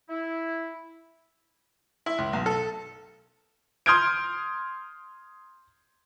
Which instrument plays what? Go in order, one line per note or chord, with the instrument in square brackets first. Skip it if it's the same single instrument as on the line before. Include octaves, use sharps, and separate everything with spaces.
[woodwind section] E4
[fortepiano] E4
C#2
B1
A4
[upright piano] C6 D#6 F6 G6 G#6 D7